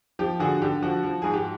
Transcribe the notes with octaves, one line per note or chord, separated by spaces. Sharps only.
F3 G4
D3 F#4 G#4
D3 G4
F3 F#4
F3
G#2 G#4
G4